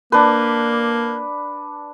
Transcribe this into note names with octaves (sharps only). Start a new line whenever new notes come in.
A#3 D4 B4